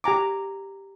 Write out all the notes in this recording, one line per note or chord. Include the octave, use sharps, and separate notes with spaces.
G4 G#5 A#5 D6